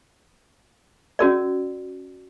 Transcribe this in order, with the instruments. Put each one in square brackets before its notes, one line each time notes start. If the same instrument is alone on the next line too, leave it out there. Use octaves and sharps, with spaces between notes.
[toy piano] C#4 F#4 A#4 D5